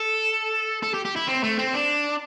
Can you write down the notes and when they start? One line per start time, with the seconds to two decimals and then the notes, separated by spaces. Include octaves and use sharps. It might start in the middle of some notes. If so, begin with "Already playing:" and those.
Already playing: A4
0.83 A4
0.94 G4
1.05 G4
1.16 E4
1.28 C4
1.43 A3
1.59 C4
1.74 D4